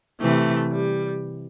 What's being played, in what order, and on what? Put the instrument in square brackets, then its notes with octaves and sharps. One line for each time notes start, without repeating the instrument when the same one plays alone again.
[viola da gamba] C3 E3 [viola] A3
[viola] G3